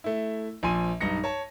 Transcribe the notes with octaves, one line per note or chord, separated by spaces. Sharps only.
A3 E4
A#1 F3 G#5 C6 D#7
B1 G2 D#4 A#6 C#7
C#5 A5